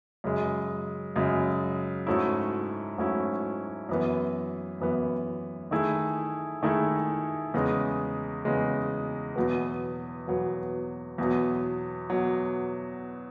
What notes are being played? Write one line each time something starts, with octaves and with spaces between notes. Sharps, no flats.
F#2 C#3 G#3
F#2 C#3 G#3
G#2 F#3 A3 C#4 E4
G#2 F#3 A3 C#4 E4
F#2 E3 B3
F#2 E3 B3
D#3 A3 E4 G#4
D#3 A3 E4 G#4
E2 C#3 G#3
E2 C#3 G#3
E2 B2 F#3 B3
E2 B2 F#3 B3
E2 B2 F#3
B2 F#3